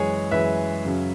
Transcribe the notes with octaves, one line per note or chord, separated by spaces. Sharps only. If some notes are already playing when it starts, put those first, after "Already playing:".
Already playing: F#2 E3 G#3 G#4 C#5
F#2 E3 G#3 B4 E5
F#2 C#3 F#3 C#4